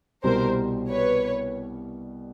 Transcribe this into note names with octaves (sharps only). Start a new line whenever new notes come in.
C2 B2 G3 A#4 C5
B4 C#5